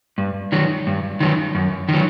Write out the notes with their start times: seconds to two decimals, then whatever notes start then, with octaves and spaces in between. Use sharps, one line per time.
0.18 G2
0.52 D#3 F#3
0.87 G2
1.20 D#3 F#3
1.55 F#2
1.89 D#3
1.94 F#3